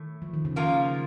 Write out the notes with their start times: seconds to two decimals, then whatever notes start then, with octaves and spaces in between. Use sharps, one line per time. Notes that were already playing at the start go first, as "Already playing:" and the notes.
Already playing: A2 D#3 A3
0.22 F3
0.34 D#3
0.45 C#3
0.56 D#3 F3 A#3 F4 A#4